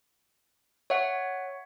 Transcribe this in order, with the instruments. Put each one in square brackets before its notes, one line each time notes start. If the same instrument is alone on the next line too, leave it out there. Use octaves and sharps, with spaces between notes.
[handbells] C#5 E5 F#5